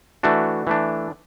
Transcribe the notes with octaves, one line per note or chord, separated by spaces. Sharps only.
E3 A3 D4 F#4
E3 A3 D4